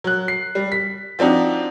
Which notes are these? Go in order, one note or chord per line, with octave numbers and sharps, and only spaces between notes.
F#3 F#6
C7
G3
B6
F3 C4 D4 D#4 F#4